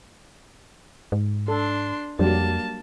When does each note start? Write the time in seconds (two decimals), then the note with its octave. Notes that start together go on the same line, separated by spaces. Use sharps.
1.12 G#2
1.48 D4 A4 C6
2.19 F2 F#3 G3 A#3 D4 A5